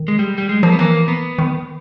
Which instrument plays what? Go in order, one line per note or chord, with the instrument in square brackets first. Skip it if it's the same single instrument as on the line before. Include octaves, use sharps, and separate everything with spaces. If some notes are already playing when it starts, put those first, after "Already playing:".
Already playing: [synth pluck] D#3
[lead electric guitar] G#3
G3
G3
G#3
[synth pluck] F3 [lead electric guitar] A#3
[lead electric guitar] B3
[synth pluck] E3 [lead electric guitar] A#3
[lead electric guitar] B3
[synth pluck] D#3